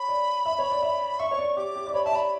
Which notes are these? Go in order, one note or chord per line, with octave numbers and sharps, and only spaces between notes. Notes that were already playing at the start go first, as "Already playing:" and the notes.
Already playing: C#5 B5
D5
E5
C#5
D5
E5
E5 C#6
C#5
D5
G4 D6
G4
D5
C#5 B5
E5 A5
D5
B5